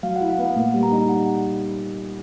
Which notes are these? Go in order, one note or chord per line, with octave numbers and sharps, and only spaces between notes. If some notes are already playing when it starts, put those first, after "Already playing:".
F#3 F5
E4 F#5
F5
B3 F#5
A#2
G3
A#5
D#4
F#5